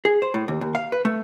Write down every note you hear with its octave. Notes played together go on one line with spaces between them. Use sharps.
G#4
C5
A2
D#2
D#2
F5
B4
A3